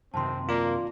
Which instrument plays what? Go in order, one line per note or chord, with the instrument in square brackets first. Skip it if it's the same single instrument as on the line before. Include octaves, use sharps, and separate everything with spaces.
[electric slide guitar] F#2 C3 D#3 [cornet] C4 [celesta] A5 C6
[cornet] A#3 [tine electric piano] F4 D5